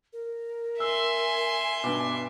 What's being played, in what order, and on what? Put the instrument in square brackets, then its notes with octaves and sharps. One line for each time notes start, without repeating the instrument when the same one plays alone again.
[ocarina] A#4
[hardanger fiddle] E5 C6 [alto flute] G#5 [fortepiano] E6
[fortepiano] G2 B2 [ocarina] D6